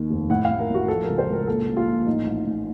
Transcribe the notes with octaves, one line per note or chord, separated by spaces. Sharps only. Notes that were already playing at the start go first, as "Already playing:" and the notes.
Already playing: D#2 D#3
F1
A2 F#5
A1 F5
A#4
A1
F#4
F3 A4
A#4
C#2
C5
C#2 A#4
A#1 A4
A#1
F4
A#1
A1 D#4
A1
A2